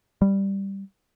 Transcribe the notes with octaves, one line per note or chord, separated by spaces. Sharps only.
G3